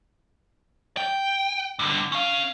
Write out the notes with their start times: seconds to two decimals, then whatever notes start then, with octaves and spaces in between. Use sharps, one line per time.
0.97 G5
1.79 G2 D3
2.12 C#4 F5